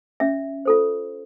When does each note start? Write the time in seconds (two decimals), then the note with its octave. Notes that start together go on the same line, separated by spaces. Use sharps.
0.20 C#4 E5
0.65 F4 A4 C5